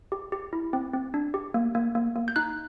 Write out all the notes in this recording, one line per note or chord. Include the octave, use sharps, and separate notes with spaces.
G4
G4
E4
C4
C4
D4
G4
A#3
A#3
A#3
A#3
G6
D#4 F#6